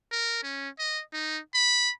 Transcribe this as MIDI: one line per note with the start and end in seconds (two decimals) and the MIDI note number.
0.12 0.39 70
0.43 0.69 61
0.79 1.01 75
1.13 1.39 63
1.54 1.91 83